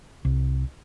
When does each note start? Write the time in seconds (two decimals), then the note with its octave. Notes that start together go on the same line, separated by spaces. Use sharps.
0.25 C2